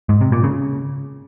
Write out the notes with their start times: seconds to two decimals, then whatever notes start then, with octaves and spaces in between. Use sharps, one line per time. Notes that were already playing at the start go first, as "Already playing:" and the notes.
0.09 G#2
0.21 C3
0.32 A#2
0.44 C#3